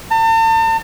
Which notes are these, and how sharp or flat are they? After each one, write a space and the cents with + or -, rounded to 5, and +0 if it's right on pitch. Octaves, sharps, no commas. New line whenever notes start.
A5 +40